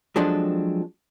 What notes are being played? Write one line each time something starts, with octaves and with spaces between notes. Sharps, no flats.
F3 F#3 G#3 C4 D4 A4